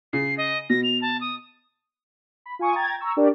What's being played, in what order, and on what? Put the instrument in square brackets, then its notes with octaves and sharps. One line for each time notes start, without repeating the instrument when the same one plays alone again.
[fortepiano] C#3 [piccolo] C7
[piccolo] D#5
[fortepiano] B2 [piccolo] A#6
[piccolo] F7
A5
D#6
[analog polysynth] B5
F4 G#5 C#6 D#6
G5 A#5 G#6 A6
A#5 C#6 E6
D4 G4 A#4 D5